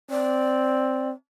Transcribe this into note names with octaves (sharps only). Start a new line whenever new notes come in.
C4 D5